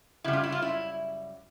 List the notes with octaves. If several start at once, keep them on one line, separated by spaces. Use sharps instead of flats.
F#2 C#3 G3 E4
F4
E4
F4
E4